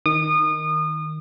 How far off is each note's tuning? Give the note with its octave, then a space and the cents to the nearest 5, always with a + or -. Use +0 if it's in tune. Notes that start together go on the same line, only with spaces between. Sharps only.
D#3 +0 D#6 -30